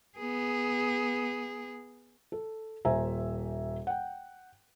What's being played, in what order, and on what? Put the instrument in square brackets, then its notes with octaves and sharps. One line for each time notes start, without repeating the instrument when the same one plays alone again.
[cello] B3 G#4
[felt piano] A4
D#1 C5 E5 G#5 A#5
F#5 G5